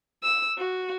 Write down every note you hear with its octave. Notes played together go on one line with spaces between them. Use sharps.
E6
F#4